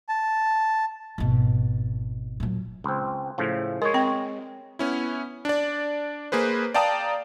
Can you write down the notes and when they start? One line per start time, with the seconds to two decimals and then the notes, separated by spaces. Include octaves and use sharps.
0.09 A5
1.18 G#1 B2
2.40 A#2 F#3
2.84 C#2 C4
3.38 A2 C#3 F3
3.82 G#3 A#4 C#5
3.94 C4 G5
4.79 B3 C#4 E4
5.45 D4 D5
6.32 A#3 G#4 B4 C5
6.74 D5 F5 G5 A5 A#5 D#6